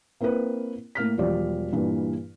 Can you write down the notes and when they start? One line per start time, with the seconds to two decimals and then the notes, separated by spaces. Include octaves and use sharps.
0.21 A#3 C4 E4 A#4 B4
0.95 A2 A#3 F6 B6
1.18 E1 F3 G3 D5
1.73 G2 A#2 E3 D4